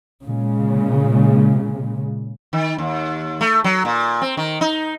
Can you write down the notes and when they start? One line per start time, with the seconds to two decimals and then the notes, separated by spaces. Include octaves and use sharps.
0.24 A#2 C#3 G#3
2.53 D#3
2.78 D#2
3.41 A3
3.64 F#3
3.85 A#2
4.22 C4
4.37 D#3
4.61 D#4